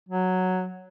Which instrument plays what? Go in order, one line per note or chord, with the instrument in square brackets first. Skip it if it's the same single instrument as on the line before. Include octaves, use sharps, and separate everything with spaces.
[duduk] F#3